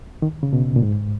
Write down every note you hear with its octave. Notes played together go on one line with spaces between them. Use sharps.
D#3
C#3
B2
A#2
G#2